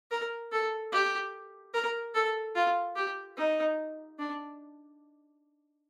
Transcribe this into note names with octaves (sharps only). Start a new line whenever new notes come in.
A#4
A4
G4
A#4
A4
F4
G4
D#4
D4